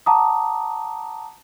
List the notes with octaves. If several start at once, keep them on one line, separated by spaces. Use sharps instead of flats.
F#5 A5 A#5 D6 D#6